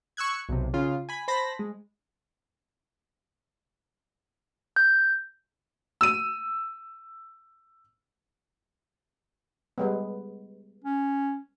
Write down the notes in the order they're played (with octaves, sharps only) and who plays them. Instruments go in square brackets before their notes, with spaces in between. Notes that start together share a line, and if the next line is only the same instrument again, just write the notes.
[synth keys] C#6 E6 F#6 G#6
B1 C3
C#3 F4
G#5 B5
C5 A5 B5 A#6
G#3
[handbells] G6
[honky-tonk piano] E6 D#7
[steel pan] G3 G#3 B3
[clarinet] C#4